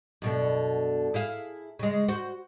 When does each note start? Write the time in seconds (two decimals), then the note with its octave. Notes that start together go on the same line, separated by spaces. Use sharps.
0.22 F#2 B2 D3
1.14 E4 G#4 F5
1.79 C#3 G#3
2.08 F#4 C5